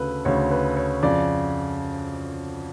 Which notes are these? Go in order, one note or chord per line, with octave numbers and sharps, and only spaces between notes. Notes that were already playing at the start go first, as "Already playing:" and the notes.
Already playing: D2 C#3 A4 B4
D2 C#3 C#5
B4
C#5
F2 C#3 D5